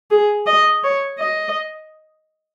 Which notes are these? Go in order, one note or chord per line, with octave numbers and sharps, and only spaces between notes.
G#4
D#5
C#5
D#5